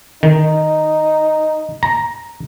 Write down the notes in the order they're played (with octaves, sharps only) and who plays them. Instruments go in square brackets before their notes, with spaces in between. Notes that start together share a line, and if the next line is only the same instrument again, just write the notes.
[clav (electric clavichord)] D#3 [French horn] D#4
[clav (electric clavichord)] A#5